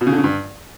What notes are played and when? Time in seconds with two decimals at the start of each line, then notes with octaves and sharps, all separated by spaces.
0.01 B2
0.07 C#3
0.12 D3
0.18 C#3
0.24 G2